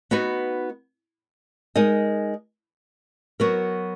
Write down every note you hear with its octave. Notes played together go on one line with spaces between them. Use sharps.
B3 D#4 F#4 B4
G#3 D#4 A#4 D#5
F#3 B3 F#4 A#4